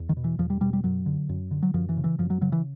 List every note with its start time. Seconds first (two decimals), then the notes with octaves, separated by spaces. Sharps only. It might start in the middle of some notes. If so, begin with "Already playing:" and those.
Already playing: E2
0.09 D#3
0.17 B2
0.24 E3
0.39 E2 F3
0.50 G3
0.61 B2 G3
0.73 G3
0.84 F#2 F#3
1.06 D3
1.29 F#2
1.51 D3
1.63 F#3
1.74 F#2 F3
1.89 E3
1.97 C#3
2.04 E3
2.19 F#2 F3
2.30 F#3
2.41 C#3 F#3
2.52 E3